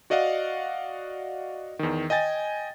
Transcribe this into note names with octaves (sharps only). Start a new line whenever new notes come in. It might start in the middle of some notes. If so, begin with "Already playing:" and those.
F#4 D5 D#5 F5 F#5
E2 D#3
D#5 G5 G#5 A6